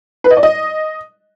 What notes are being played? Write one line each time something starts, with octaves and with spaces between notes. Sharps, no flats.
B4
D#5
D5
D#5